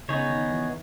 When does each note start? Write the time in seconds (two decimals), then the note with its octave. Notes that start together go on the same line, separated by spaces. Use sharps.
0.09 C#3 B3 D#4 G#4 C#5
0.30 D#3
0.51 E3